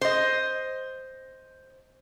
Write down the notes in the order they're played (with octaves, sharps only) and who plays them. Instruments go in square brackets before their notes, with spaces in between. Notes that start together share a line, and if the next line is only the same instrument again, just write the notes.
[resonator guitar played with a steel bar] C5 D#5